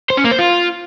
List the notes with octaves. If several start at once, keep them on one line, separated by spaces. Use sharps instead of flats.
C5
C#4
A#3
C5
F4